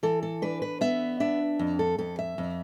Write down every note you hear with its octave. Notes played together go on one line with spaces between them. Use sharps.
E3 A4
A4
D4 B4
B4
B3 E5
D4 E5
F2
A4
F2 A4
E5
F2